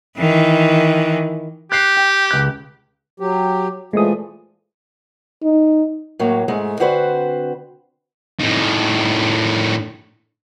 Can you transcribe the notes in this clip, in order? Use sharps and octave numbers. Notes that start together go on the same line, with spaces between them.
D#3 E3
G4 F#6 C7
G5
C#2 F#6
F#3 G4
A#2 E3 F3 G#3 A3 D#6
D#4
A2 F#3 A#3
G#2 G#3 A3
D3 C4 F#4 B4 C5
A2 D#3